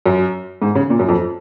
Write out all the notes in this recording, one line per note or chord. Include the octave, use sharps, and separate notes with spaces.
F#2
G#2
C#3
A#2
F#2
F2